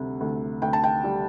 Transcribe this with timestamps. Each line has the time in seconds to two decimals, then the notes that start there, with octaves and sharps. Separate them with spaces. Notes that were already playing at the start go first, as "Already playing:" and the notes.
Already playing: D2 C3 G3
0.21 D2
0.62 D2 G5
0.73 A5
0.84 G5
1.04 G3